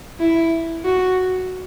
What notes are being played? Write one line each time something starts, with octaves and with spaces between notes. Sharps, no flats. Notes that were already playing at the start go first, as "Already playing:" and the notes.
E4
F#4